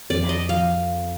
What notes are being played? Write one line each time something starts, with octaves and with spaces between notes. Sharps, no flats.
F2 D5
D#5
F3 F5